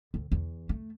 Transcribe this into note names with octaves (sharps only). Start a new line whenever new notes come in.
D2
E2
A3